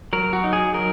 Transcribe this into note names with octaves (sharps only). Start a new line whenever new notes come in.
F#3 A#4
F#4
D#4
G#4
F#3 A#4